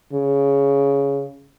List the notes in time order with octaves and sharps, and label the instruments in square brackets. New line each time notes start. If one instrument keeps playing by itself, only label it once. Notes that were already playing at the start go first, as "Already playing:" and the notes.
[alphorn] C#3